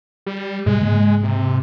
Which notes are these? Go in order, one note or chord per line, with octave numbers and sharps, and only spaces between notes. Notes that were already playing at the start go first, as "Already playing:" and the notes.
G3
G#2 B2 G3 G#3
G#2 C#3 A#3
C3